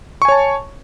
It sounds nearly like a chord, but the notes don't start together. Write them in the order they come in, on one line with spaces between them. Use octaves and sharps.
C#6 G#5 C#5 A5